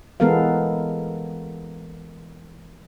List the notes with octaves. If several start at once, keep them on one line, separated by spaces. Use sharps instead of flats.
E3 G#3 B3 A4 A#4 F5